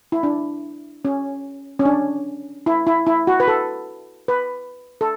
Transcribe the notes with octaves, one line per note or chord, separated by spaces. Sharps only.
E4
D4
C#4
C#4
D4
E4
E4
E4
F#4
B4
A4
B4
A4